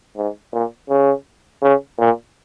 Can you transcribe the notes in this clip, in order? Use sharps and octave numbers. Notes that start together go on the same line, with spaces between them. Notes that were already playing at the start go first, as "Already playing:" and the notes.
G#2
A#2
C#3
C#3
A#2